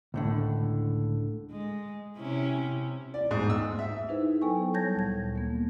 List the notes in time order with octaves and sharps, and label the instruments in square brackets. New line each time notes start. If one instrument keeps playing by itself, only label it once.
[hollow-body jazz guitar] C#2 A2 D3
[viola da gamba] G#3
C3 C#4 E4
[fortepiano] D5
G#2
E6
E5
[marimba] D#4 E4 G#4 B4 C5
F#3 B3 A4 G5 G#5 C#6
G3 C#5 A5 G6 G#6 A#6
D2 A#2 G#6
A#3 B3